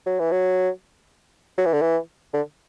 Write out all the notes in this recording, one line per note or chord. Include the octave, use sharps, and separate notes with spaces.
F#3
E3
F#3
F#3
E3
D3
E3
D3